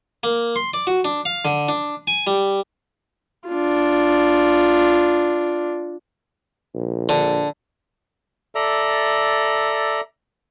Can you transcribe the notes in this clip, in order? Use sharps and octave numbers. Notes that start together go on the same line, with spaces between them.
A#3
C6
D5
F#4
D4
F5
D3
D4
G#5
G3
D4 F4
A#1
D3
A4 D5 E5 A#5